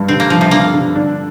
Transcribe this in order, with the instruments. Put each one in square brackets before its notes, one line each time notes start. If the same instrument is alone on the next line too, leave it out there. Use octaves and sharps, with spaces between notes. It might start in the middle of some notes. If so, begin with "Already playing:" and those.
Already playing: [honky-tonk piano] G2 G3
[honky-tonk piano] D3 [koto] C4
[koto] A#3
[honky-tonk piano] D3 [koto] F3
[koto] C3
[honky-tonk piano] D3 [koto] A#3
[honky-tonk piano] D3
D4